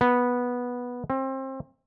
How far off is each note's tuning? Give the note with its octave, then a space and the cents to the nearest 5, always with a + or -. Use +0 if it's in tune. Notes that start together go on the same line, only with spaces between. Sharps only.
B3 -10
C4 +30